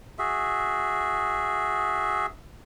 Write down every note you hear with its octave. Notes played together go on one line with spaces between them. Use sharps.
F#4 G#4 E5